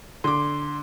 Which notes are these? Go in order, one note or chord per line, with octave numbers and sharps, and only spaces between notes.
D3 C6 D6